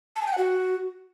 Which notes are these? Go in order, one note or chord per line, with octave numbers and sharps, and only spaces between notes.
A5
G#5
G5
F#5
F#4